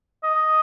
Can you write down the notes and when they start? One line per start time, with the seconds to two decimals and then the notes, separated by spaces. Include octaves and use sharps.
0.24 D#5